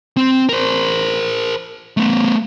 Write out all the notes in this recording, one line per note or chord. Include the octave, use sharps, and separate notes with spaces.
C4
A#4 C5
A3 B3